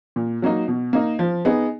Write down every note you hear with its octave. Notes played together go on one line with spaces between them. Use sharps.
A#2
F#3 A#3 D#4
B2
A#3 D#4
F3
B3 D#4 G#4